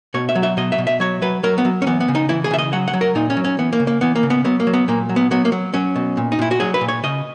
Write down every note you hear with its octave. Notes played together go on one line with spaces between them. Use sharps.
B2 C#5
E5
F#3
E5
B2 D#5
E5
B2
E5
F#3 C#5
F#3 B4
F#3 A#4
B3
F#3
C#4
E3 B3
B3
C#3
D#4
E3 E4
G#4
C#3 E5
D#5
F#3 F#5
F#5
F#3
A#4
A#2 D#4
C#4
F#3
C#4
E3 B3
A#3
C#3
A#3
E3 B3
A#3
C#3
B3
F#3 B3
A#3
F#3
B3
A#2 A#3
F#3
B3
F#3 B3
A#3
F#3
F#3 C#4
B2
A#2
D#4
A#2 E4
F#4
F#3 G#4
B4
A#2
C#5
C#3 D#5